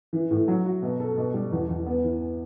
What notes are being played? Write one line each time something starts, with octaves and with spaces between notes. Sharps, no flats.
E3
A2
F#3
F#4
B2
A4
B2
G3
E2
E2
B3
E3